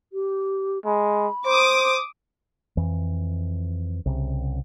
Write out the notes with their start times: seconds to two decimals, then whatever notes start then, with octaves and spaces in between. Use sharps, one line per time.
0.13 G4
0.85 G#3 B5
1.46 C5 D6 D#6
2.77 F2 E3
4.06 C2 C#3